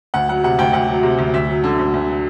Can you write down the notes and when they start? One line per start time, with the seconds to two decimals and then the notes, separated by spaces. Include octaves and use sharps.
0.14 D2 F#5
0.29 F#3 F#5
0.44 C3 F#5
0.59 D2 G5
0.73 D2 F#5
0.89 F#3
1.03 C3
1.19 D2
1.34 D2 E5
1.49 F#3
1.64 D3
1.79 D2
1.94 D2
2.08 F#3